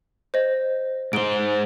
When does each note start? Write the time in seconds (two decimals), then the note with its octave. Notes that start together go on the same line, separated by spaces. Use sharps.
0.34 C5 D#5
1.13 G#2 C5 D7 G7